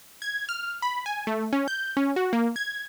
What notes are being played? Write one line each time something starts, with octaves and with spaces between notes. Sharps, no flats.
G#6
F6
B5
G#5
A3
C#4
G6
C#4
F#4
A#3
G#6